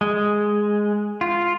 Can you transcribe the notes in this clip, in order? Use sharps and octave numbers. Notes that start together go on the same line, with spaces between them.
G#3
F4